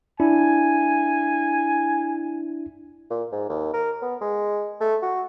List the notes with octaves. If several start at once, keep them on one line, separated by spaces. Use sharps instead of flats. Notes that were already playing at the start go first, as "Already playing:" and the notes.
D4 E4 G#5
A#2
G#2
D#2
A#4
B3
G#3
A3
F#4